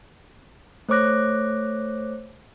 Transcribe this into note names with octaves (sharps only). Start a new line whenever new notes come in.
A3 C5 C#5 D6 F#6 A#6